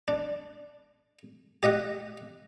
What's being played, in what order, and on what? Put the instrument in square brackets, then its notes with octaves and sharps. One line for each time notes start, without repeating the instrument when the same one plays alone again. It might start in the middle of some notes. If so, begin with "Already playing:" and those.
[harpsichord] D4
G4 D#5 E5 F#5